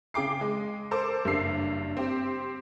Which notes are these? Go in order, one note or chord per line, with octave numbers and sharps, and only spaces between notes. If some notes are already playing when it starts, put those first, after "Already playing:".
C#3 G#4 G5 D6 C7
G#3
A4 A#4 C5 D6
F#1 G2 C#3 G3 E6 C7
C4 G4